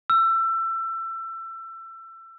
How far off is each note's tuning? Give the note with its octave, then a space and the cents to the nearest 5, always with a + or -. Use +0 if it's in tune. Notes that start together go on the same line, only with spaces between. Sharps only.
E6 +25